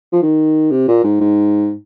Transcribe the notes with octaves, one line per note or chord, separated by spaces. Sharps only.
F3
D#3
C3
A#2
G#2
G#2